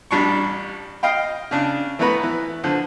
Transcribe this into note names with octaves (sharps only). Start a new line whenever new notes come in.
A1 G3 D4 C#6
D#5 F5 G5
C#3 D4
E3 A3 B3 B4 A#5
E3
D3 F3